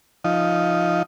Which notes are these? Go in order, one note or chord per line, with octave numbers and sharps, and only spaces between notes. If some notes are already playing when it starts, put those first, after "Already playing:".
F3 D#4